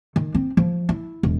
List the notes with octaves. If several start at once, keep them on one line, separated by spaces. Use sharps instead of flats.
D#3
C4
F3
E4
E1